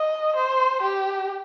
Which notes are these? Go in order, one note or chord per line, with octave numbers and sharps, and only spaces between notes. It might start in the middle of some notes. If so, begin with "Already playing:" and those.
Already playing: D#5
C5
G4